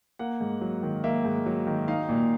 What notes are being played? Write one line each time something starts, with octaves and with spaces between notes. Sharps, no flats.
A#3 F#5
G#2
F#3
D#3
A#3 E5
G#2
F#3
D#3
D#4 F5
A#2